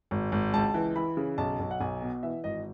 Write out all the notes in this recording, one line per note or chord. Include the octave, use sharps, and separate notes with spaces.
G#1
G#1
C#2 A5
E3
E3 B5
C#3
B1 A5
B1
F#5
B1 G#5
B2
E3 E5
G#1 D#5